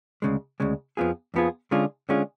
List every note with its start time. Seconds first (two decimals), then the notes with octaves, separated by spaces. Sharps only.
0.22 D2 C#3 G#3
0.60 D2 C#3 G#3
0.97 F2 F3 B3 F4 G#4
1.34 F2 F3 B3 F4 G#4
1.71 D3 G#3 C#4 F4 G#4
2.09 D3 G#3 C#4 F4 G#4